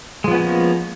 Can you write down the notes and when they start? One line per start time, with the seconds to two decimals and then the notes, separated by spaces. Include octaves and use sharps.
0.24 G#3
0.28 F3
0.31 B3
0.35 C#4
0.38 A#3